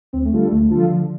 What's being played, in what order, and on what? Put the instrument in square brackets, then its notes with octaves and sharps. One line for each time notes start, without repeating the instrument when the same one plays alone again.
[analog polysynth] D2 [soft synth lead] C4
[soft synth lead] A3
[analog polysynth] D3 G3 F4 A4
[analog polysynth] D2 [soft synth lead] A3
[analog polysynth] D3 G3 F4 A4
[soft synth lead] F3
[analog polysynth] D3 [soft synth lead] F3